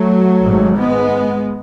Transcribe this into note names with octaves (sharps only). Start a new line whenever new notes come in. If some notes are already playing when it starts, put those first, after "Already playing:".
Already playing: F#3 A3
G#1 G#2
G#3 B3